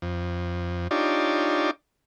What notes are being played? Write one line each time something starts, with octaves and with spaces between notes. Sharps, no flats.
F2
D4 D#4 F4 G4 C#5 D5